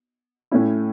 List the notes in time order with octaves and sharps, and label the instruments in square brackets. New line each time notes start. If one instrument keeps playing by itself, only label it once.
[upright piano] A2 A3 C#4 E4